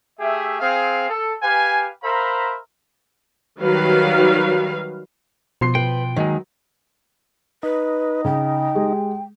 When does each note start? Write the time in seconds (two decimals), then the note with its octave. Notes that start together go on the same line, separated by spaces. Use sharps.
0.20 A3 G4 G#4 E5
0.61 C4 G#4 F5
1.10 A4
1.43 G4 B4 F5 G#5
2.03 A#4 C5 E5 F5 A#5 B5
3.60 D#3 F#3 G3 B4 F5
5.61 B2 F3 C6 C7
5.75 B4 G5
6.16 D#2 D#3 F#3 G#3
7.63 D#4 B4
8.25 C#3 G5
8.75 G#3 G4 G#4